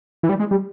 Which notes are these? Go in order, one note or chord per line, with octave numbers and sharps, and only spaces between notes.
E3
G3
G#3
G3